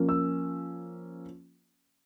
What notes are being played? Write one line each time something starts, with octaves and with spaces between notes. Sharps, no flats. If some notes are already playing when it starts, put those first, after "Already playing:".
Already playing: F3 A#3 C#4
E6